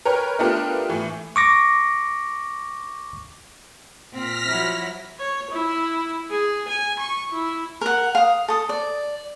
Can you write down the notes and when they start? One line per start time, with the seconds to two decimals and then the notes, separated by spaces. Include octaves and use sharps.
0.05 A#4 B4 C#5 G5 A#5 B5
0.39 A3 B3 D4 F4 G4 A#4
0.89 A2 E3
1.36 C#6 D6 A#6
4.12 A#2 C4 F6 A#6 B6
4.47 F3 F#3 E4
5.19 C#5
5.51 E4
6.30 G#4
6.68 G#5
6.99 C#6
7.32 E4
7.81 A#4 F#5
8.15 F5 D#6
8.48 A4 D#6
8.69 D5